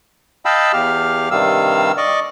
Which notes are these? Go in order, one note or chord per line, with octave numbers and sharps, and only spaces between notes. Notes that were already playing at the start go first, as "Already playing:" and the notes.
D#5 F5 G5 A5 B5 E6
E2 G4 F5 F6
G2 C3 D#3 G3 F5 E6
D5 D#5 C#6 D6